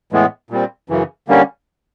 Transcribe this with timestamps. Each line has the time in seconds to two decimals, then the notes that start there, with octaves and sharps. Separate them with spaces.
0.12 A2 E3 G#3 B3
0.51 A#2 G3 C4
0.89 F#2 C#3 E3
1.28 D3 G3 A#3 C#4